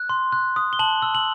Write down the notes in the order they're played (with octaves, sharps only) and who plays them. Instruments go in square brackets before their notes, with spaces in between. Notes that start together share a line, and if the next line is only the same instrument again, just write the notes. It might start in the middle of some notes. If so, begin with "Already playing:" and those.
Already playing: [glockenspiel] F#6
C6
F#6
D#6
G7
A5 F#7
E6
F#7